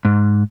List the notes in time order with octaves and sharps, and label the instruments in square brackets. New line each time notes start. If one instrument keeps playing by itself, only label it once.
[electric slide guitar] G#2